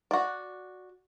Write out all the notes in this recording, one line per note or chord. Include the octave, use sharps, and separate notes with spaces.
F#4 D5